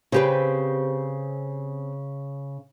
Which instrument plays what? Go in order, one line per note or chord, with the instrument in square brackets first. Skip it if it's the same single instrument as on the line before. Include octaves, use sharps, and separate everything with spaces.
[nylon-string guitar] C#3 [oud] C4 G4 B4